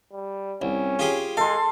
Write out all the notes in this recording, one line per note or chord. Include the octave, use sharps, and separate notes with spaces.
G3
C2 C#4
F4 G4 G#4
G#3 A4 F5 C6